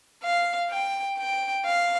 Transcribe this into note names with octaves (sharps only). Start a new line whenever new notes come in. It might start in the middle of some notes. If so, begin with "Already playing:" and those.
F5
G5
G5
F5